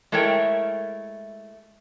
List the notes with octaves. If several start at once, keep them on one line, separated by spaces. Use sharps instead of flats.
G#3 A3 E4 A#4 C#5 G5